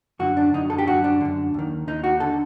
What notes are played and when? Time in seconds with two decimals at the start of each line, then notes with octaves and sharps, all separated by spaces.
0.19 F#2 D3 F#4
0.37 D4
0.54 F#2 D3 D#4
0.70 A4
0.78 G4
0.87 F#2 D3 F#4
1.04 D4
1.21 F#2 D3
1.54 D#2 D#3
1.87 D#2 D#3 D#4
2.04 F#4
2.20 D3 A4